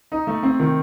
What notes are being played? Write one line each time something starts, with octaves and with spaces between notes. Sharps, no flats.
D#4
A3
C4
D#3